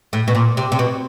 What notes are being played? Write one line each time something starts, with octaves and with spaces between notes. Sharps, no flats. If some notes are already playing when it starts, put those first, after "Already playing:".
A2
B2
A#2
C3
C3
B2